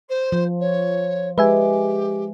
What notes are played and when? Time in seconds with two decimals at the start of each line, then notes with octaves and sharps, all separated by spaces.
0.09 C5
0.32 F3
0.60 C#5
1.38 G#3 G4 B4 E5 G#5